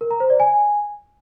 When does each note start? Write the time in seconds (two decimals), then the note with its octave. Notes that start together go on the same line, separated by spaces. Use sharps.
0.01 A#4
0.11 A#5
0.20 C5
0.30 D5
0.40 G#5